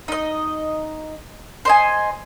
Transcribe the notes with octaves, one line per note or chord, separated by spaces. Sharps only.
D#4 D#5
C5 D#5 G#5